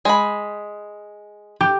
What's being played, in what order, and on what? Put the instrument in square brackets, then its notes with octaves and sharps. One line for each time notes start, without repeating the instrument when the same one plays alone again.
[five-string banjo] G#3 B5
[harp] G4